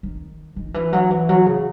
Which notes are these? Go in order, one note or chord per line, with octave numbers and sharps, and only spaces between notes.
D#3
D#3
E3
F#3
E3
F#3
C#3